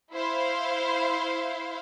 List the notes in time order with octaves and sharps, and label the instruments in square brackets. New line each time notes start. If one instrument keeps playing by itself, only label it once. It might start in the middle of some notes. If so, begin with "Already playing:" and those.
[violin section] E4 C5 F5